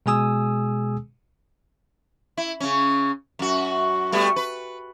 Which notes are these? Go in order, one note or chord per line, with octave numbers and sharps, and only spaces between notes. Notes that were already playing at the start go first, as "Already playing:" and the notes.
B2 G#3 G#4 G#5 D#6 E6
E4
C#3 C#4
F#2 F#4
G3 A3 B3
B4